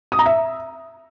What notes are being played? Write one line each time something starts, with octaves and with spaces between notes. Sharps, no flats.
D#6
A#5
E5